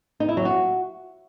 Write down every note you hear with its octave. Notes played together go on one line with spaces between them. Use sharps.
D#4
E4
F#3
F#4